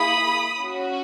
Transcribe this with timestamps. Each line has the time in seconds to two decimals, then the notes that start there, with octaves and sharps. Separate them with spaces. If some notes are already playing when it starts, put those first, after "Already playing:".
Already playing: A#3 E4 G#4 B5 D#6
0.62 C#4 F#4